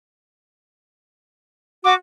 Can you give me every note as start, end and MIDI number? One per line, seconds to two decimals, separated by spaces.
1.84 1.94 66
1.84 1.94 86